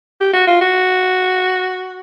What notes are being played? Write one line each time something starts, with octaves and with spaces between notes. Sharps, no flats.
G4
F#4
F4
F#4